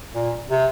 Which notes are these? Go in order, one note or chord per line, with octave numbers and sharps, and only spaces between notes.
A#2
C3